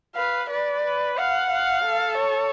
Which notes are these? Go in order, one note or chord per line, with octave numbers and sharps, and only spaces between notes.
B4 F5
B4 D5
B4
F5 F#5
F5
A4
C#5